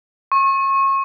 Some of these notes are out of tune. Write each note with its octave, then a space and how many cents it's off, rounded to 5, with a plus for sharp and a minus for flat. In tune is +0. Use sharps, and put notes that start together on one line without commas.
C#6 -30